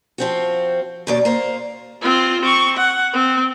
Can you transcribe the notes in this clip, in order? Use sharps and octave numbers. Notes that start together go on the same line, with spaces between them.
F3 C4 F#4
D#2 B2 D5
A#3 C5
C4 F4
C4 C#6
F#5
C4